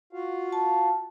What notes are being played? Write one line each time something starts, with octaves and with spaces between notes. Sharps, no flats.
F4 F#4 F5
A5